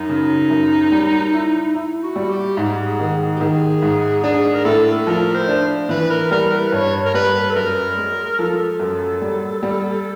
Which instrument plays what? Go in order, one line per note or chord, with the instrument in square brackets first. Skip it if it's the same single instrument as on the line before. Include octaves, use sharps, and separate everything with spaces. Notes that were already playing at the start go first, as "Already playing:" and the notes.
Already playing: [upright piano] F#2 [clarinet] D#4
[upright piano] C#3
F#2
G3
E4
E4
[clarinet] F#4
[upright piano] G3
[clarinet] G4
[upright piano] G#2 [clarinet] G4
[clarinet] G#4
[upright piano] D#3
[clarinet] G4
[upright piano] D#3 [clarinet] G#4
[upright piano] G#2
[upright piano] D4 [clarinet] G#4
[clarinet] A#4
[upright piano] A2 [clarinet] A4
[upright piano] F3 [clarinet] A#4
[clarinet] C5
[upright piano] D4
[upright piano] E3 [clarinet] B4
[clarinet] A#4
[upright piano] G3 [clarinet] A#4
[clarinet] B4
[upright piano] G2 [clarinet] C#5
[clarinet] A#4
[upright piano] G3 [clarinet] B4
[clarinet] B4
A4
[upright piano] F#2 [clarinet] A#4
[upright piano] G#3
[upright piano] F3 [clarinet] A4
[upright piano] F#2
G3
G3